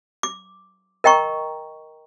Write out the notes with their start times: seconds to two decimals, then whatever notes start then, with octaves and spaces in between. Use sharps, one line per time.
0.23 D6
1.04 A#4 D#5 G5 A#5 C#6